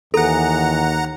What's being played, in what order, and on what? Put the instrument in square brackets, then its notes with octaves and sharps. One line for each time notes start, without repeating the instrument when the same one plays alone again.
[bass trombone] D#2 [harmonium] E3 [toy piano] A4 [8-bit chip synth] F#5 A#5